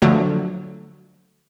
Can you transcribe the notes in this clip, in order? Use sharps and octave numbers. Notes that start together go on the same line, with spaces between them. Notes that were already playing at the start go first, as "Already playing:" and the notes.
D3 F3 F#3 A3